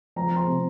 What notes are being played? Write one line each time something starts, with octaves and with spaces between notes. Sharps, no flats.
F3 A#5
F3
C6
C3